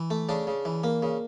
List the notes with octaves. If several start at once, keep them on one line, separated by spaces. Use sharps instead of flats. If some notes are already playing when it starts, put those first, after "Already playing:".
Already playing: E3
A3
C#3 D4
C#3
E3
A#3
C#3